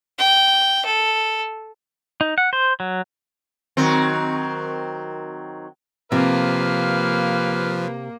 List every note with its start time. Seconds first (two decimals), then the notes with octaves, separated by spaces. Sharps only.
0.18 G5
0.85 A4
2.21 D#4
2.38 F#5
2.53 C5
2.80 F#3
3.77 D#3 F#3 C4
6.12 C3 F3 A#3 B4 F5